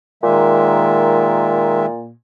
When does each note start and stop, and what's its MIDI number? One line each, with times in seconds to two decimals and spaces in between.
0.23 2.13 46
0.23 1.86 51
0.23 1.86 56
0.23 1.86 76